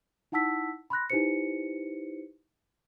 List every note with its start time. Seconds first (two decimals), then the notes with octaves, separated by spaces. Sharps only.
0.32 D#4 E4 F#5 A5 E6 B6
0.90 B5 C6 F#6 A#6
1.10 D#4 E4 G4 B4 C5 C#7